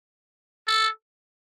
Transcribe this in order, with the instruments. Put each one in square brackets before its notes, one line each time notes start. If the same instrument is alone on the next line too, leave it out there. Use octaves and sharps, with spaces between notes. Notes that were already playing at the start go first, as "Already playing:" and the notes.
[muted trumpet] A4